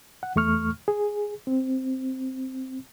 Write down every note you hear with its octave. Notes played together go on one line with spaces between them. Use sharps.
F#5
E2 A3 C#6 F6
G#4
C4